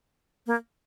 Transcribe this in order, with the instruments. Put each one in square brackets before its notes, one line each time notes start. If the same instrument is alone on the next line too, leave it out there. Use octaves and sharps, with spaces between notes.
[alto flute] A#3